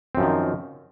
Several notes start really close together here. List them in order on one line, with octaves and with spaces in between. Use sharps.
C4 F#2 F3 D#3